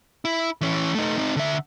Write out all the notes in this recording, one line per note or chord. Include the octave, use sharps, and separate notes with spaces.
E4
E3 C#4
A3 D#4
C4 D#4
D3 E5